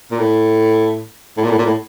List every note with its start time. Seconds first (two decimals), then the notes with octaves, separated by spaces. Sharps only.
0.11 A#2
0.19 A2
1.37 A2
1.44 A#2
1.51 A2
1.59 A#2
1.66 A2